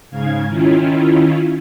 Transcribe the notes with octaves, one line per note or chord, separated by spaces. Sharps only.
G#2 C#3 F5 G#6
D#3 C#4 E4 F4